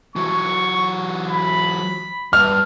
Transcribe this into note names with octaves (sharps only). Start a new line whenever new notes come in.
E3 F#3 C#6
B5
G2 F6